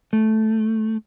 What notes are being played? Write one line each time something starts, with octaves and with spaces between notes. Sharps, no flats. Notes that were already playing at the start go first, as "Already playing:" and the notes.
A3